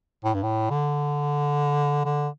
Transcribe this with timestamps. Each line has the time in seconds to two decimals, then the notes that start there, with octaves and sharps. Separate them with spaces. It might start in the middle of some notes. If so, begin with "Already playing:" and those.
0.25 A2
0.34 G2
0.43 A2
0.70 D3
2.05 D3